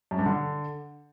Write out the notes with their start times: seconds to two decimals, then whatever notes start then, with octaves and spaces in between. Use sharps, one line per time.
0.11 F#2
0.18 G2
0.26 D3